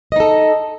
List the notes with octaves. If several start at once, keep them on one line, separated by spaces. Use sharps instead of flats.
D#4 A4 D#5